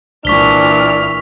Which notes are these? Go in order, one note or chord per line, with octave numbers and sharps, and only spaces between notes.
C2 A#2 E3 D4 C#6 F6 B6 G7